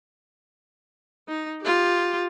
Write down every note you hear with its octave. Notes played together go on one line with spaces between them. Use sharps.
D#4
F4 G4